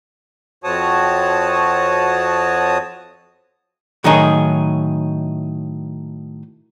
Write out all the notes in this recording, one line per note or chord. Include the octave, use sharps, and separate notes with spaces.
F2 C4 F#4 C#5 A5 D#6
A2 D#3 F#3 D#4 G#4